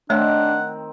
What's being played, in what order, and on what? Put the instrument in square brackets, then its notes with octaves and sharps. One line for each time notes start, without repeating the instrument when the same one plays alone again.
[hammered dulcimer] D#3 C4 [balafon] A3 C#5 [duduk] D4 [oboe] F#5